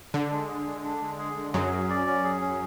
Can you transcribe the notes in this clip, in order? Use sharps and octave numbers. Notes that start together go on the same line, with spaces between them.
D3 D4
G#3
G#4
G#3
D4
G#3
G#4
G#3
F#2 F#3 G#4
C#4
D5
C#4
G#4
C#4